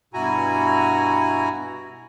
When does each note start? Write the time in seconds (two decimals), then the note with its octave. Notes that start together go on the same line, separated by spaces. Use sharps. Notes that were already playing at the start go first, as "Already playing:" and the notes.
0.14 G2 B2 E4 F#4 G#5 A#5